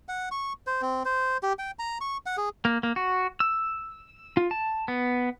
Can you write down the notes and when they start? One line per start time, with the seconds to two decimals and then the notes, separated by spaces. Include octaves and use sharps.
0.09 F#5
0.31 C#6
0.67 C5
0.82 C4
1.05 C5
1.43 G4
1.59 G5
1.79 A#5
2.01 C#6
2.26 F#5
2.37 G#4
2.65 A#3
2.83 A#3
2.96 F#4
3.40 E6
4.37 F4
4.51 A5
4.88 B3